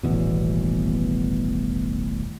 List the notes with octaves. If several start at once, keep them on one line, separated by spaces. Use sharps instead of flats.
D#1 A1 E2 B2